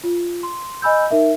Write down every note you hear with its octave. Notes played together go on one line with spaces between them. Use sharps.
F4
C6
D#5 G#5 B5 E6 G6
D#4 A#4 E5